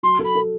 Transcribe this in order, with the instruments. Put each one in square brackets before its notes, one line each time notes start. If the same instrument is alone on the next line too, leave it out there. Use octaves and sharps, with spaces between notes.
[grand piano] F#3 [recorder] C6
[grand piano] A4
[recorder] B5
[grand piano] A4